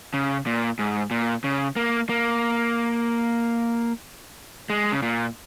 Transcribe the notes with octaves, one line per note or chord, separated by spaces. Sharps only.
C#3
A#2
G#2
A#2
C#3
A#3
A#3
G#3
C#3
A#2